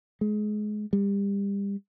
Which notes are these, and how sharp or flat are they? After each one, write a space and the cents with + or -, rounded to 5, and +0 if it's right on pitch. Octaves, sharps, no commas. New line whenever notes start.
G#3 +25
G3 +30